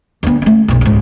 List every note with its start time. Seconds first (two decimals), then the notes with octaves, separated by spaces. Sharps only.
0.23 D2 B3
0.42 A3 C#4
0.68 B1 F2
0.81 C#2 G#2